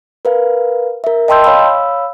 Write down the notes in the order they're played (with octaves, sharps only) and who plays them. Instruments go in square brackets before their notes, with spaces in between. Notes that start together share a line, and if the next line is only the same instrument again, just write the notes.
[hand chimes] A#4 B4 F5
A#4 E5
D#5 G5 A5 C6 E6 G6
C#5 F5 B5 E6